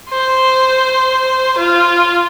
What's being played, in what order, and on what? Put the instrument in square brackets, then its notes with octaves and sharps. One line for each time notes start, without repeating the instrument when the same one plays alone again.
[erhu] C5
F4